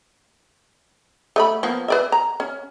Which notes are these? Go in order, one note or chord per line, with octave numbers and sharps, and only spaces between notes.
A3 D#5 B5
F3 A#3 B3
B4 D5 E5
A#5
C#4